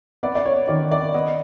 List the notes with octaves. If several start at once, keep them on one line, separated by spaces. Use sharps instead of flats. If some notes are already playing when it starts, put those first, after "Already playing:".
B3 D5
D5
C#5
D#3 D5
D5
B3 D#5